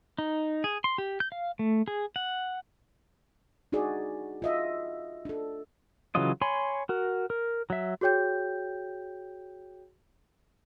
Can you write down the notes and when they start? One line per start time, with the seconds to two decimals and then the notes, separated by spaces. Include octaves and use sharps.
0.18 D#4
0.64 G#4
0.84 C6
0.98 G4
1.20 G6
1.32 F5
1.59 A3
1.88 G#4
2.16 F#5
3.72 D4 D#4 F#4 G#4 D5
4.42 F4 D#5 E5
5.25 D4 A4
6.15 C#3 E3 F#3 F4 D#5
6.42 C#5 G#5 B5 C6
6.89 F#4 A#4
7.30 A#4
7.70 F#3 E5
8.01 F#4 G#4 C#5 G5 G6